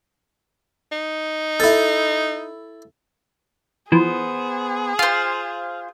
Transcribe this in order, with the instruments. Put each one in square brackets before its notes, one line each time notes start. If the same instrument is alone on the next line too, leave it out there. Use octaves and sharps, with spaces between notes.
[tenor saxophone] D#4
[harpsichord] E4 A4
[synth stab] E3 F3 [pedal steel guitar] B3 C5 [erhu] G#4
[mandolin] F4 C5 [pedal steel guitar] F5 [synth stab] C7